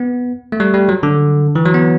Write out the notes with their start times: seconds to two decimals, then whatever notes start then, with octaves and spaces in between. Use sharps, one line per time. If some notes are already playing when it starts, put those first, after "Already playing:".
Already playing: B3
0.52 A3
0.60 G3
0.74 G3
0.89 F#3
1.03 D3
1.55 E3
1.65 F#3
1.74 B3